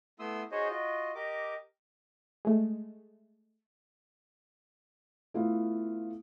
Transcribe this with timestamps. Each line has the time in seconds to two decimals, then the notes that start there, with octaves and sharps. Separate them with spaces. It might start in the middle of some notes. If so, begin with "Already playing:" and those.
0.19 A3 B3 E4 C6 D#6 E6
0.52 D#4 F#4 G#4 C5 C#5 D#5
0.69 F4 F#4 D#5
1.15 G4 A#4 D#5 D6
2.45 G#3 A3
5.34 A3 B3 E4 F4